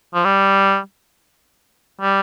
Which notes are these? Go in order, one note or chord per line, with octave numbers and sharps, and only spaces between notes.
F3
G3
G3